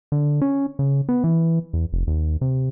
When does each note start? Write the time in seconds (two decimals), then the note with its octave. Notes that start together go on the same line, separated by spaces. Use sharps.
0.12 D3
0.42 C#4
0.79 C#3
1.09 B3
1.24 E3
1.73 E2
1.93 F1
2.07 D#2
2.41 C3